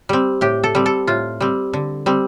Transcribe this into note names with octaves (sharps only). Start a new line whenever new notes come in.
G3 C4
A2 G4
A4
G3 C4
A4
A2 F4
G3 C4
D3
G3 C4